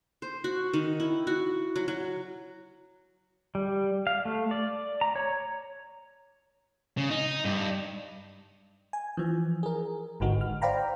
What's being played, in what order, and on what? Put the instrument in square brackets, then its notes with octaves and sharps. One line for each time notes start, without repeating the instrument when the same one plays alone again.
[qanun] C5
F#4
D#3
E4
F#4
F#3
F#3
[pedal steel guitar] G3
F5
A3
D5
A#5
C#5
[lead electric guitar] C#3
D#4
G2
[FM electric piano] G#5
E3 F3
G#4 A#4
G#1 G#2 D3 D#4 F#4
F6
C5 D5 F5 G5 A#5 B5